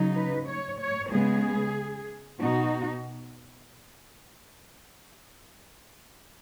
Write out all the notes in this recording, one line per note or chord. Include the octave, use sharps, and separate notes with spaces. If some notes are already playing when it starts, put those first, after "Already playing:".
Already playing: C#3 F#3 D#4
B4
C#5
C#5
C#3 G#3 B3 G#4
B2 B3 D#4 F#4